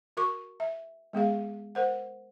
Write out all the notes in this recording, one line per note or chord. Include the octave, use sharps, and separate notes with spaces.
F#4 A#4 C#6 D6
E5
G#3 B3 G#4 F5
A#4 C5 F#5